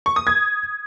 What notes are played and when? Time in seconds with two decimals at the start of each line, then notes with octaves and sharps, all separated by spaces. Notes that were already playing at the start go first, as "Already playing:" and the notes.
0.06 C#6
0.16 D#6
0.27 G#6